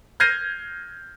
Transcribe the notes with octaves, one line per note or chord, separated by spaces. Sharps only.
F6 G6 G#6 A#6 C7 D#7